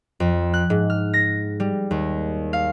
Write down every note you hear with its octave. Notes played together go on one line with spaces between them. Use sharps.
F2
F#6
G#2
F6
A#6
G3
D#2
F5